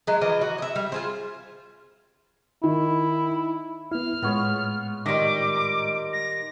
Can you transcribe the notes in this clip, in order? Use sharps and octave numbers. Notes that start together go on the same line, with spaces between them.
F#3 G#3
E3 F3 D#5
F#4
D#5 E5
G3
F4 G#4 C5
D#3 E4
B3 E4 F6
A2 G#3 B3 F4 C#5
D#3 G3 D#5 A#5 C6 D6
A#5
A#6